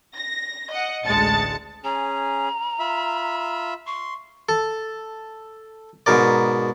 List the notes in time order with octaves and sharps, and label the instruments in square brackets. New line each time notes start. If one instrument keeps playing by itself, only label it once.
[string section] A#6
D#5 F#5
A1 D2 G#3 A5 A6 C#7
[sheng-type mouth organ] C#4 G#4 [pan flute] A#5
[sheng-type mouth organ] F4 E5 B5
[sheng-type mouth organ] C6 [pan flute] C#6
[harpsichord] A4
G#2 B2 A#4 D5